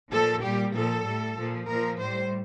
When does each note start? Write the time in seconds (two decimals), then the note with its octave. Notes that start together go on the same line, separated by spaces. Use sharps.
0.10 A#2 F3 A4
0.42 A#2 G3 G4
0.73 A#2 F3 A4
1.04 A2 G3
1.36 A#2 F3
1.67 A#2 F3 A#4
1.99 A2 G3 C5